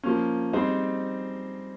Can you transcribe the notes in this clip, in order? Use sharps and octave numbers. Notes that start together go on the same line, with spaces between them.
F3 A#3 C#4
G3 C4 D#4 G#4 C5